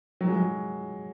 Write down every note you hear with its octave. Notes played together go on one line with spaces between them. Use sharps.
F#3
G#3
F#3